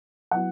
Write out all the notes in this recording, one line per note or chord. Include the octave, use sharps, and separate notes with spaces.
F#3 B3 E4 F#5